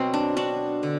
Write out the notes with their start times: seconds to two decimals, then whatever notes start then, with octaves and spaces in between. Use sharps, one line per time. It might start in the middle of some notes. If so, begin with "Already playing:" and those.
Already playing: B2 F#3 B3 C4
0.14 D4
0.37 D4 F#4
0.83 D3